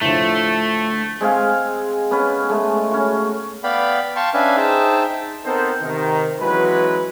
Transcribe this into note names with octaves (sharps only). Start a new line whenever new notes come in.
A2 D3 F3 A3
G#3 C4 G#4 F5
B3 C#4 B4
G#3 A3
C#4 F#4
B3 D5 F5 G5 B5
F5 G5 A5 C6 C#6
C#4 D4 B4 E5 F5 G#5
D#4 G#4 C5 E5 G5 A5
B3 C4 D#4 A4 A#4 C5
C3 D#3
E3 F#3 G#3 C#4 F#4 B4